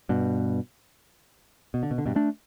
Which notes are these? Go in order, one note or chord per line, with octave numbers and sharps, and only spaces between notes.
G2 B2
B2
D3
B2
D3
G2 B2
A3 D4